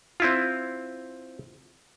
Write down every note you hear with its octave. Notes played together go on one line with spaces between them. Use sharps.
C4 E4 F4